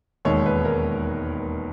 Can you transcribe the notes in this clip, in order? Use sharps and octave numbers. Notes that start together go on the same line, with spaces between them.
E1 D#2 D#3 G#3 C#5
B4
A#4